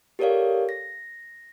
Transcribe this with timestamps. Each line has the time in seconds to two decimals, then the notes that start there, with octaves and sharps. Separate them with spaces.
0.19 G4 A4 A#4 C#5 D5 F5
0.69 A#6